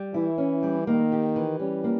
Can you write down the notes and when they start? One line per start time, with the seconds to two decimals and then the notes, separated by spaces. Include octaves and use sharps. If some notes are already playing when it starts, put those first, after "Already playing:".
Already playing: G3
0.14 E3 E4
0.38 C#4
0.63 G3
0.87 D#3 A#3
1.12 G4
1.36 E3
1.60 G3 C#4
1.84 A#3